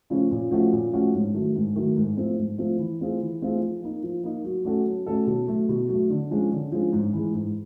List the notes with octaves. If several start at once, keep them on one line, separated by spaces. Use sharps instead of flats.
C#3 F3 A3 C#4
A#2
F3 A3 C#4 F#4
A#2
F3 A3 C#4 F#4
G#2
D#3 F#3 A3
G#2
D#3 F#3 A3
G#2
F3 A3 C4
G#2
F3 A3 C4
E3
A3 C4 F4 G#4
E3
A3 C4 F4 G#4
F3
A#3 D#4
F3
A#3 D#4
F#3
A3 C#4 F#4 A4
F#3
A3 C#4 F#4 A4
B2
F#3 A3
B2
F#3 A3
D3
F3 G#3 C#4
D3
F3 G#3 C#4
G#2
E3 G#3
G#2